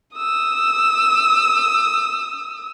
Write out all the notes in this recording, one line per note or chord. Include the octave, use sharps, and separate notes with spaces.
D#6 E6